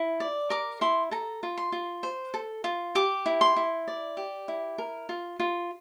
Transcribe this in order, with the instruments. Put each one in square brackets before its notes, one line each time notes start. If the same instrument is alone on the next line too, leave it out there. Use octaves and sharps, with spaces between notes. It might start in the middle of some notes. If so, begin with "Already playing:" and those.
Already playing: [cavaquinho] E4
D5
A#4 D6
E4 C6
A4 A#5
F4
C6
F4
C5
A4
F4
G4 D6
E4
C6
E4
D5
G4
E4
A#4
F4
F4